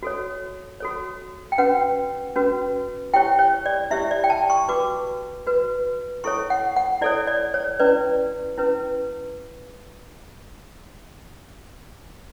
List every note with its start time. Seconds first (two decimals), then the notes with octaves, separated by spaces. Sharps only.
0.03 F#4 A4 C#5
0.80 F#4 A4 C#5
1.52 G5
1.58 C#4 F#4 B4 F#5
2.36 C#4 F#4 B4
3.14 E4 G4 C#5 G5
3.39 C#5
3.66 D5
3.91 E4 G4 C#5 E5
4.11 D5
4.24 G5
4.30 A5
4.50 C#6
4.68 F#4 B4 D6
5.47 F#4 B4
6.24 E4 A4 C#5 C#6
6.50 F#5
6.76 F#5
7.01 E4 A4 C#5 D5
7.27 D5
7.54 C#5
7.80 C#4 E4 B4 D5
8.57 C#4 E4 B4